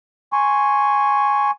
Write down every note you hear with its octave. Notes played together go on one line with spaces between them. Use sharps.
G#5 C6 C#6